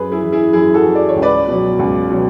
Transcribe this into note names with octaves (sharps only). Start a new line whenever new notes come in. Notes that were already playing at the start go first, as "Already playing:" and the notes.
Already playing: F#2 G#4 B4
E4 G#4
E3
E4 G#4
F#2 E4 G#4
F#4 A4
E3
D5
C#5
C#2
B4 D5
B2 F#3
C#2
B2 F#3